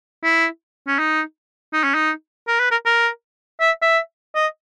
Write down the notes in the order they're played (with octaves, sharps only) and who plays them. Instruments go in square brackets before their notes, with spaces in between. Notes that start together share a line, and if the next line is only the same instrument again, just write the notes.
[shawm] E4
C#4
D#4
D#4
C#4
D#4
A#4
B4
A#4
A#4
E5
E5
D#5